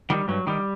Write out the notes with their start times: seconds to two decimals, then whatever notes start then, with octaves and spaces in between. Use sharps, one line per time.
0.10 D#3 G3
0.28 G2 F#3
0.47 D#3 G3